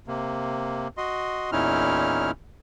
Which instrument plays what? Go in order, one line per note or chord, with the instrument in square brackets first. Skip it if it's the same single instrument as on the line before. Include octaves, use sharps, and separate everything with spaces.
[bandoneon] C3 A#3
F#4 D#5 C6
E2 A#2 C#4 D#4 E4 F6